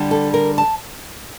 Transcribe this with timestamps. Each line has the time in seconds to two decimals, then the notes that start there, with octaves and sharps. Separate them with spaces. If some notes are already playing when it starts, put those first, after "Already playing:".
Already playing: D3 G3 D4
0.11 A4
0.34 A#4
0.58 A5